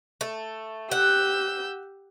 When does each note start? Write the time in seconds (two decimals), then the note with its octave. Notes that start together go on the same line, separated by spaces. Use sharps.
0.21 A3
0.91 G4 F#5 E6 G6